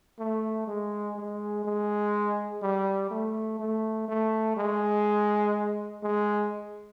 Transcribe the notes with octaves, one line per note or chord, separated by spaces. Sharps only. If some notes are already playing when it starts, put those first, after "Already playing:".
A3
G#3
G#3
G#3
G3
A3
A3
A3
G#3
G#3